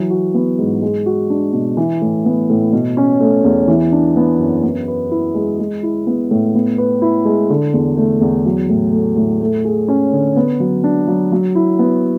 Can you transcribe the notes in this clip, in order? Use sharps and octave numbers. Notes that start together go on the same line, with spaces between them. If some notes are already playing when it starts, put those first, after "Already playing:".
Already playing: E3 F#3
F#4
B3
G#2
G#3
F#4
D4
B2
E3
A2
B3
A2
B2
C#4
A3
E2
E3
D4
B3
F#2
B3
B4
E4
G#3
G#3
E4
B3
A2
B3
B4
E4
G#3
D3
E2
A3
E2
F#3
A2
A3
A2
A3
G#4
C#4
D3
B3
F#3
D4
F#3
F#3
E4
B3